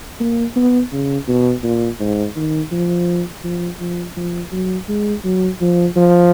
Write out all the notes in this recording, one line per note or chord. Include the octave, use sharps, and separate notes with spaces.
A#3
B3
C#3
B2
A#2
G#2
D#3
F3
F3
F3
F3
F#3
G#3
F#3
F3
F3